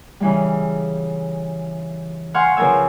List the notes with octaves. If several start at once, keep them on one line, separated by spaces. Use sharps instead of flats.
C#3 E3 G3
F5 F#5 G#5 C6 C#6
C#3 F3 A#4 B4 G#5 E6